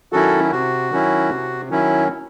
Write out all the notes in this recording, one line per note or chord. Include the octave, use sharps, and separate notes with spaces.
D#3 F#3 C#4 E4 F#4 A4
C3 F#4
D#3 F#3 C#4 E4
C3
D#3 F#3 C#4 E4